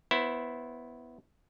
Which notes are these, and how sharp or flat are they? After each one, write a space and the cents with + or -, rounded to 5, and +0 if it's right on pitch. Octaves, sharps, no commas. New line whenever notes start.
B3 +0 E4 +0 C5 +30